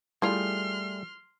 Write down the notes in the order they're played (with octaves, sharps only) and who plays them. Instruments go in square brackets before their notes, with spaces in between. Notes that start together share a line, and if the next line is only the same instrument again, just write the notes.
[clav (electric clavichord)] G3 A3 G#4 [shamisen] E4 F4 [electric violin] C6 F6